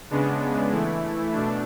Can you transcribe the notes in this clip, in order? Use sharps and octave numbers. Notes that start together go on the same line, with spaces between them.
C#3 G#3 B3 D4
E3 A3 E4
B2 A3 D4